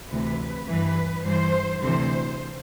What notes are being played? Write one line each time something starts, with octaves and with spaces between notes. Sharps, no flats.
D2 C3 E3 B4
G2 E3 B4
G2 E3 C5
D2 C3 E3 C5